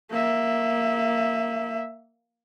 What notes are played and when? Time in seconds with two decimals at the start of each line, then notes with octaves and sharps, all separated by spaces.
0.11 A#3 E5